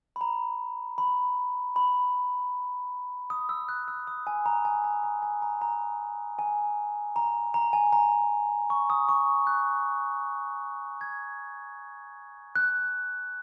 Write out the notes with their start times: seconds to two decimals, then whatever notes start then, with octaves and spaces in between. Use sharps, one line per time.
0.16 B5
0.21 A#5
0.98 B5
1.76 B5
3.30 D#6
3.49 E6
3.69 F#6
3.88 E6
4.07 D#6
4.27 G#5
4.46 A#5
4.65 G#5
4.84 A#5
5.04 A#5
5.22 G#5
5.42 A#5
5.61 A#5
6.39 G#5
7.16 A#5
7.54 A#5
7.73 G#5
7.93 A#5
8.70 C#6
8.90 D#6
9.09 C#6
9.47 F#6
11.01 G#6
12.56 F#6